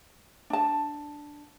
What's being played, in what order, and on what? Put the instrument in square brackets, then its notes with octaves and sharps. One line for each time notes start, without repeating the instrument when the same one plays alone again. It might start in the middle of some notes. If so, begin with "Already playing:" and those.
[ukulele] D4 A5